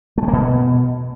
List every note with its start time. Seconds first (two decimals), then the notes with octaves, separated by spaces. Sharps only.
0.18 A3
0.23 G#3
0.28 A#3
0.33 B2